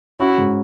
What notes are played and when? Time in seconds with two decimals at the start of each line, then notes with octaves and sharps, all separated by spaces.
0.20 C#4 E4 F#4
0.38 G#2